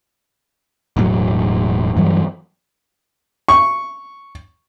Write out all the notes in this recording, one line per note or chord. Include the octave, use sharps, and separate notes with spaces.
E1 A2 F#3
G2 E3 F#3
C#6